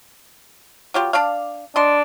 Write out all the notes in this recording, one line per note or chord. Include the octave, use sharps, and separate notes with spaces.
F#3 F4 G4
D4 D5 F5
D4 D#5 C6